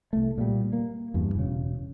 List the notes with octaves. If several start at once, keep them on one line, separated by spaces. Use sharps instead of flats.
C2 A3
A#2 G3
A#3
E2 G2
E1 C#3